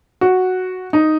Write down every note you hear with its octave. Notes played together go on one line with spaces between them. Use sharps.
F#4
D#4